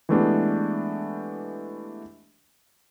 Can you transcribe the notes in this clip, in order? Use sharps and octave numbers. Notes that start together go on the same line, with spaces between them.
E3 G#3 A3 B3 D4 G4